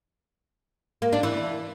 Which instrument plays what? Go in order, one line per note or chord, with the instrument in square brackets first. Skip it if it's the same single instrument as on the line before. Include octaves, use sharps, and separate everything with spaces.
[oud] A#3
D4
E3